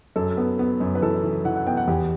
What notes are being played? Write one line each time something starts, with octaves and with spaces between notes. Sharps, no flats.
F#2 A4
B3
B3
F#2
B4
E3 A4
E3
E3 F#5
F#5
B3 G5
F#5
E2 G4